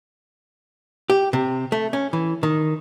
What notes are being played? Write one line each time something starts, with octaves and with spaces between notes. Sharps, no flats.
G4
C3
A3
C#4
E3
D#3